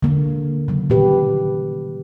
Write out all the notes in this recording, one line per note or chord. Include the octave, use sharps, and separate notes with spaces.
D3 A#3
C#3 F#3
A#2 D#3 G4 B4